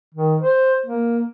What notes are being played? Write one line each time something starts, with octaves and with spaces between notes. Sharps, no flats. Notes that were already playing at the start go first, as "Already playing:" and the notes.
D#3
C5
A#3